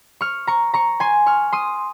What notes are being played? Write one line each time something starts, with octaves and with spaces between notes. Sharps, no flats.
C#6 F6
A#5 C#6
A#5 C#6
G#5 C6
C#6 F6
C6 D#6